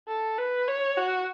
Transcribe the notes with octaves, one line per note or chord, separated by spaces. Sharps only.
A4
B4
C#5
F#4